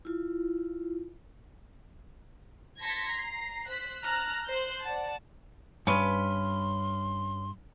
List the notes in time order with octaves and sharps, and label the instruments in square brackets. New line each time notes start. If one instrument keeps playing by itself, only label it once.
[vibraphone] E4 F4
[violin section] A5 C6 G#6 A#6 B6 C#7
A#5 C7
C5 F#6 B6
A5 A#5 F6 F#6
C5 F#6 G6
D5 F#5 A5
[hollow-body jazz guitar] G2 [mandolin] C#4 B4 [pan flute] C6